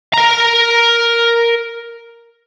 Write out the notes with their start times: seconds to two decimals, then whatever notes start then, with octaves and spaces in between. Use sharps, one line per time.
0.13 A#4 A#5